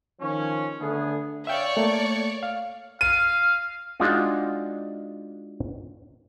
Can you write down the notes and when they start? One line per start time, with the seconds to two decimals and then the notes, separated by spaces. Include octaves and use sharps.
0.21 D#3 F3 C#4
0.79 D3 A3 B3 G#4
1.47 C#5 D5 E5 F5 G5 C#6
1.77 A3 A#3
2.43 F5
3.01 F5 D#7
4.00 G#3 D4 D#4 F4 F#4